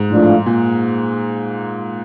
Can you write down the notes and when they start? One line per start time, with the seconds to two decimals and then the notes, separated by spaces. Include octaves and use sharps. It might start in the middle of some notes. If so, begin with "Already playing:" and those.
Already playing: G#2
0.10 A2 F3 A3 D4 F4
0.46 A#2